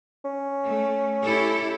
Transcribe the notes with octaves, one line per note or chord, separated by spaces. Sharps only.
C#4
A3
E4 G4 A4